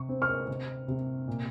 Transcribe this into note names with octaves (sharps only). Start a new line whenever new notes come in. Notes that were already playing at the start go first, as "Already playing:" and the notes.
Already playing: C3 C#6
C4
C#6 F6
C3
C3
A#2